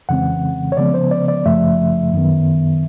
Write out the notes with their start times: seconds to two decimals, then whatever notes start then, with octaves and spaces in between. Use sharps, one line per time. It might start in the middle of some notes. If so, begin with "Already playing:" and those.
0.09 F2 C#3 E3 G#3 C4 F#5
0.72 C#5
0.77 C#3 F3 G#3 B3 D5
0.94 C5
1.11 D5
1.28 D5
1.45 F#2 C#3 F3 A3 E5
2.13 F#2 D#3 F#3 B3